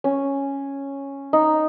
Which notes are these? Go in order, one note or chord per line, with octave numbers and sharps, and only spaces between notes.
C#4
D#4